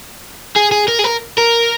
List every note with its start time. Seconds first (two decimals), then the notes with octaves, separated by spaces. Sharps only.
0.56 G#4
0.72 G#4
0.88 A#4
0.99 G#4
1.04 A#4
1.38 A#4